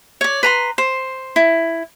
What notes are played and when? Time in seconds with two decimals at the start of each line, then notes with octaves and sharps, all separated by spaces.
0.21 C#5 D5
0.43 B4 A#5 C6
0.78 C5
1.36 E4